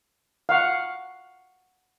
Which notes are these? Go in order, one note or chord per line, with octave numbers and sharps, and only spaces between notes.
F5 F#5 C#6